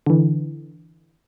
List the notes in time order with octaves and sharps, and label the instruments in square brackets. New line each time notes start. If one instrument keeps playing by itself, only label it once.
[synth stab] D3 E3